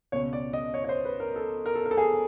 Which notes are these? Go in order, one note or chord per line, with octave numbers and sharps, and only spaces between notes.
C#2 B2 C#5
D5
D#5
C#5
C#5
C5
B4
A#4
A4
A#4
A4
A#4
A4
G#4